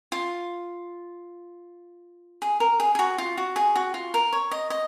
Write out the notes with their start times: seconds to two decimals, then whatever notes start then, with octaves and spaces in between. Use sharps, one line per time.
0.12 F4
2.42 G#4
2.60 A#4
2.80 G#4
2.95 G#4
2.99 F#4
3.18 F4
3.38 F#4
3.56 G#4
3.76 F#4
3.94 F4
4.14 A#4
4.33 C#5
4.51 D#5
4.70 D#5